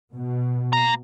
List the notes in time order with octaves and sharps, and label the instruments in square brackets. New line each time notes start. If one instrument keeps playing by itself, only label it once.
[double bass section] B2
[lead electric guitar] A#3 A#5